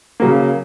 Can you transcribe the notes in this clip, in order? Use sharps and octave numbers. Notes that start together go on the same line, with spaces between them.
C#3 F#3 A#3